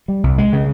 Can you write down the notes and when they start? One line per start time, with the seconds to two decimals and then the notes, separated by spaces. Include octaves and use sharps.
0.08 G3
0.24 C2
0.38 G#3
0.53 C#3